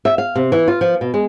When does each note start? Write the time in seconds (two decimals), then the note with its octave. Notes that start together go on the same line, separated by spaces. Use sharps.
0.05 E5
0.18 F5
0.36 C3
0.52 E3
0.68 F4
0.81 F3
1.01 B2
1.14 G#3